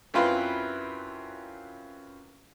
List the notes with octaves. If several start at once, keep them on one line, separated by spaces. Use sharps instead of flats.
F#2 C4 E4 F4 B4 C6